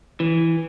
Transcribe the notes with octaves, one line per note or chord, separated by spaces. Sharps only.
E3